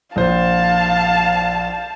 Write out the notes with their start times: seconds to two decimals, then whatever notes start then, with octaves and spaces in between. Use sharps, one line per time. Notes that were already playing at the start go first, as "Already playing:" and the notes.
0.16 A#1 C5 F5 A5